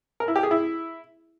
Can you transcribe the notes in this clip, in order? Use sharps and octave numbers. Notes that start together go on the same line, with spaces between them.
A#4
E4
G4
G#4
E4